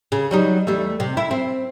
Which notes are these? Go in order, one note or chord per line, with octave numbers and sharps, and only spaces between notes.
C#3
F#3 G3 D#4
E2 G3 A3
C3
E4
C4